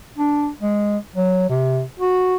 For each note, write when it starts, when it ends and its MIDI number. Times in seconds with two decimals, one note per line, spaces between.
0.18 0.49 62
0.61 0.97 56
1.16 1.47 54
1.49 1.82 48
1.99 2.36 66